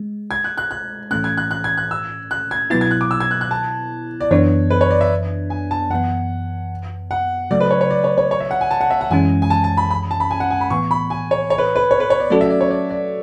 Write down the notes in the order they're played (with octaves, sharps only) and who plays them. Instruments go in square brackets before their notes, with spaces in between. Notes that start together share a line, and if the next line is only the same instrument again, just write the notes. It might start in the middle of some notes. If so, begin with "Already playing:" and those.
Already playing: [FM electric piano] G#3
[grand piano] G#6
F#6
F#6
F#6
[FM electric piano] A2 E3 A3 C#4 [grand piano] F#6
[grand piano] G#6
F#6
F#6
G#6
F#6
E6
F#6
G#6
[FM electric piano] B2 F#3 B3 E4 [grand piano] A6
[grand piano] G#6
F#6
D6
E6
G#6
F#6
F#6
A5
D5
[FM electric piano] F#2 E3 B3 D4 [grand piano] C#5
[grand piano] B4
C#5
D5
E5
G#5
A5
[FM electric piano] F#2 E3 B3 [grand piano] F#5
[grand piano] F#5
[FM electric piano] C#3 F#3 A3 [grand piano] D5
[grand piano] B4
C#5
C#5
D5
C#5
C#5
C#5
E5
F#5
G#5
A5
F#5
E5
F#5
[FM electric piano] F#2 E3 G#3 C#4 [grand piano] G#5
[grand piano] G#5
A5
A5
B5
B5
A5
B5
G#5
F#5
G#5
B5
[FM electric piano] A2 E3 B3 [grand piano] C#6
[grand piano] B5
G#5
C#5
C#5
B4
B4
C#5
B4
C#5
D5
[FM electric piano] F#3 A3 C#4 F#4 A4 [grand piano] D5
[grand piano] E5
D5
C#5
D5
D5